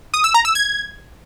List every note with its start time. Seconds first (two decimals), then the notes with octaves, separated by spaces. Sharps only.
0.14 D#6
0.24 E6
0.34 A#5
0.45 E6
0.55 G#6